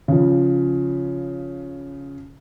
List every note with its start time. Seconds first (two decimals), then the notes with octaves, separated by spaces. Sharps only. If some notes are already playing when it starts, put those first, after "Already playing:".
0.08 C#3 F3